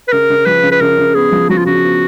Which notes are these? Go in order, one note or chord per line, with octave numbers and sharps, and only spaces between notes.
B4
C#3 A#4
C#3
F3 B4
C#3
B4
C#3 A#4
C#3
B3 G#4
F3
F3 F#4
F4
C#3 F#4
B3